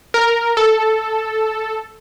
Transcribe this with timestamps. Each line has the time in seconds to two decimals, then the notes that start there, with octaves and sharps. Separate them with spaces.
0.14 A#4
0.57 A4